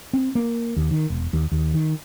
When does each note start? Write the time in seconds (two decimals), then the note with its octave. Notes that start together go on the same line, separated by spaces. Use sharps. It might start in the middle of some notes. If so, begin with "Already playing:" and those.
0.13 C4
0.35 A#3
0.76 D#2
0.91 D#3
1.10 E1
1.33 D#2
1.52 D#2
1.74 D#3